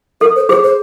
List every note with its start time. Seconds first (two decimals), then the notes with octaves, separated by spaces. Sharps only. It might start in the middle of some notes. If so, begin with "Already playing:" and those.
0.21 A4 A#4
0.35 C5
0.49 G#4 C5
0.63 C5